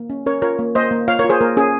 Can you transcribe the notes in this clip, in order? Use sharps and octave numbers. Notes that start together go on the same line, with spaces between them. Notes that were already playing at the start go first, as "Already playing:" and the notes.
Already playing: A#3
C#4
C#4 A#4 C#5
F4 A#4 C#5
A#3
A#3 C5 D#5
A#3
F4 C#5 F5
A#4 C#5
F4
G#4 C5
A#3 A#4
C#4 G#4